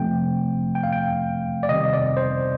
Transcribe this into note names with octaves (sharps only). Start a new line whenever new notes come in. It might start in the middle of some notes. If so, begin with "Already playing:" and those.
Already playing: C3 F3 A3 C4 G5
G5
F5
G5
D5
C3 D#3 G3 C4 D#5
D5
C5